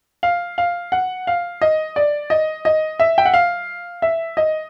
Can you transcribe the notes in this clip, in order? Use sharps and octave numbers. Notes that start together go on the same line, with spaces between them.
F5
F5
F#5
F5
D#5
D5
D#5
D#5
E5
G5
F#5
F5
E5
D#5